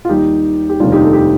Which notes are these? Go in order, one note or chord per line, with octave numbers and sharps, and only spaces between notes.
F4
D#2 D#3 G3 D#4 G4
G4
F1 D#2 D#3 G3 D4 F4
D#4 G4
A4
G4